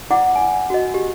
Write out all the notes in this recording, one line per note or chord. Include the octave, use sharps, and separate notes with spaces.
E4 D5 F#5 D6
G#5
F#4 D#5
G4